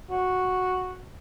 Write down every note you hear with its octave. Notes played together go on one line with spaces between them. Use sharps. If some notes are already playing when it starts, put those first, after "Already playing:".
F#4